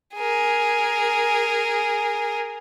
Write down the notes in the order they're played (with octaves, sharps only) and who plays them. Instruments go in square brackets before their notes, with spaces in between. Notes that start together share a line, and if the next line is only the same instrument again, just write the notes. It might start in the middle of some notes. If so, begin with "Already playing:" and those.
[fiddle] G#4 A#4